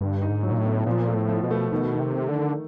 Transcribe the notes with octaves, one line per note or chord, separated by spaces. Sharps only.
G2 D3
D#4
G#2
F#3
A#2
A2
B3
A#2 F3
A3
A2
F3
B2
A3
B2 D#3
D#3
C3
A3
D3
D#3